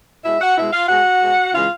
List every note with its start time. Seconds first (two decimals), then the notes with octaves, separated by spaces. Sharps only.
0.24 B2 G#3 E4 E5
0.40 F#4 F#5
0.56 B2 G#3 E4 E5
0.72 F4 F5
0.88 B2 G#3 F#4 F#5
1.22 B2 G#3
1.53 C#3 E3 G#3 F4 F5